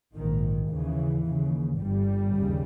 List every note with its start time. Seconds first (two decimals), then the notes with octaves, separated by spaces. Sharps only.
0.15 A#1 G#2 D#3
0.69 D#2 C#3 E3
1.24 D#2 C#3
1.79 G1 G2 G3
2.34 D#2 C#3